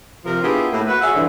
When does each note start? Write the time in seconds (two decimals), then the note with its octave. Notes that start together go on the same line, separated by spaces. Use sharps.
0.25 C3 F3 A#4
0.42 B3 D4 E4 F4 G4 G#4
0.71 A2 A#3
0.87 F#4 B4
1.01 F#4 G#4 C#5 E5
1.14 G2 D3 E3